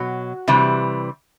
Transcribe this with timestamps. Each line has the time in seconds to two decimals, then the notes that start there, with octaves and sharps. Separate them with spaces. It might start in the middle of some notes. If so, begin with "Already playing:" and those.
Already playing: B2 F#3 F#4
0.48 C3 E3 G3